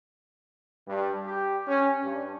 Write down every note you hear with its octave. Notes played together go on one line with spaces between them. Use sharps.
G2
G4
C#4
G2